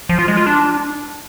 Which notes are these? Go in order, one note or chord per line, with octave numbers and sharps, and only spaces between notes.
F3
F4
G#3
F4
D4